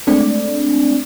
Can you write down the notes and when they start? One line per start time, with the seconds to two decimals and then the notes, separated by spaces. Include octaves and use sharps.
0.07 G#3 A3 C4 D4 D5